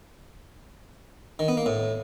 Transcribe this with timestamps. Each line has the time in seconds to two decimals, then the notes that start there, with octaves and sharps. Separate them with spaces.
1.39 D#3
1.48 B3
1.57 A#3
1.66 A2